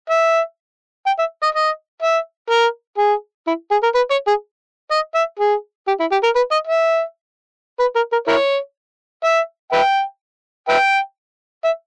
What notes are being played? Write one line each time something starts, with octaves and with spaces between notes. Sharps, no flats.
E5
G5
E5
D#5
D#5
E5
A#4
G#4
E4
G#4
A#4
B4
C#5
G#4
D#5
E5
G#4
G4
E4
G4
A#4
B4
D#5
E5
B4
A#4
A#4
E4 A#4 C#5
E5
B4 E5 G5
B4 E5 G5
E5